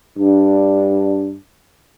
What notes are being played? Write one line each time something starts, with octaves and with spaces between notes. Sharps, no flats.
G2 D4